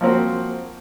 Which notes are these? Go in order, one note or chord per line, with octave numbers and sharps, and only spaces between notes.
F3 A#3 C4 F#4